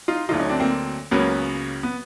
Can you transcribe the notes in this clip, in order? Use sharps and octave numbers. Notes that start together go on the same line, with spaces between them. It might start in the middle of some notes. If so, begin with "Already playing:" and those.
D#4 F4
D2 D3 F#3 D#4 F4
C#4 D#4
C4 D4
A#3 C4
C#2 C#3 F#3 A#3 B3 C#4
B3